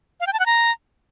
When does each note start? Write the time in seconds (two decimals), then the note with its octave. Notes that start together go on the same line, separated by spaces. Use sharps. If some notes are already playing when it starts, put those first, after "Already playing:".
0.20 F5
0.27 G5
0.33 A5
0.40 F#5
0.46 A#5